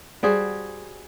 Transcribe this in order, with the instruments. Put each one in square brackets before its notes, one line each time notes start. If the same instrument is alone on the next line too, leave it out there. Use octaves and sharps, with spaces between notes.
[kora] G3 F#4 G#4 C5